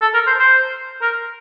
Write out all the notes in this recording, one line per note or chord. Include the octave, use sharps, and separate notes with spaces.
A4
A#4
C5
C5
A#4